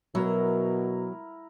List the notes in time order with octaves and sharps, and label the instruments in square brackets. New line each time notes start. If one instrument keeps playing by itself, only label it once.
[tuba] B2 [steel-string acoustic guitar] F#3 [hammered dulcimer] E4 A#4